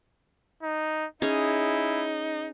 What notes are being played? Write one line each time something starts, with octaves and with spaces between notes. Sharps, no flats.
D#4
C#4 D#4 E4 G#4